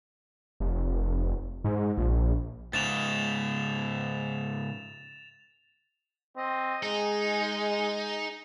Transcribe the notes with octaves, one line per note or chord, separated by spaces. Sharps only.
F1
G#2
A#1
G#2 C#3 A6 E7 F7
C4 D#5
G#3 D#4 G#4